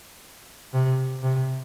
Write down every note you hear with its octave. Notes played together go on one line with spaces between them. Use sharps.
C3
C3